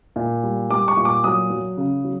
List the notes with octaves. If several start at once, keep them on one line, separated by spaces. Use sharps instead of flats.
A#2
G3
G3 D6
C#6
A#2
D6
F#3 D#6
F#3
C#3
F#3